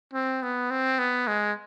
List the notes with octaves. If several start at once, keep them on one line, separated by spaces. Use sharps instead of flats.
C4
B3
C4
B3
G#3